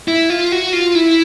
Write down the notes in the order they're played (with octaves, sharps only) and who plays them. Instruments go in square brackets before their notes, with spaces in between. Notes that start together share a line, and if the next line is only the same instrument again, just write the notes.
[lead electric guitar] E4
F4
F#4
F4
E4